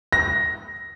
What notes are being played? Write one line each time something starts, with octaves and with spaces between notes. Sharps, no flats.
A#6